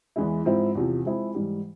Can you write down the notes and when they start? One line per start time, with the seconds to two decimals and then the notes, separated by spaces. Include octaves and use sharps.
0.16 E2 E3 G#3 E4
0.45 G#2 F3 C4 E4
0.75 E2 C3 F3
1.05 F3 G#3 C4 E4 G#4
1.35 G#2 E3 G3